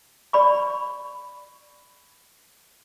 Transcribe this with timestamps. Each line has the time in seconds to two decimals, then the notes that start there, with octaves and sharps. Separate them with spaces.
0.33 D5 B5 C#6